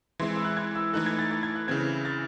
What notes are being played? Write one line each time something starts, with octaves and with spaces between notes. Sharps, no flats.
E3 G#3 C4 E4 C6
E6
F#6
G#6
E6
E3 A3 D#4 A4 F#6
G#6
A6
A6
G#6
F#6
C#3 E3 C4 G#6
A6